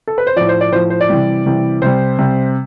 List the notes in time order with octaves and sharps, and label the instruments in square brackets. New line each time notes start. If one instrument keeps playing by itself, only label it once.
[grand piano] A4
B4
C5
A2 F3 D5
C5
D5
A2 F3 C5
C5
D5
C3 E3 G3
C3 E3 G3
C3 G3 C5
C3 G3